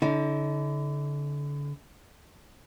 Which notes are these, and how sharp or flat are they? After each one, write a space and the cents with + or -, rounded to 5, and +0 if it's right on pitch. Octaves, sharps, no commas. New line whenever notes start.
D3 -30 D#4 +45